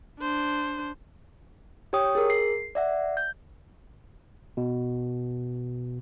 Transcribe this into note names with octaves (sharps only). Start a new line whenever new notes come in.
D4 C5
G4 C#5 G5 D#6
G#4 A#4
C7
D5 E5 F#5
G6
B2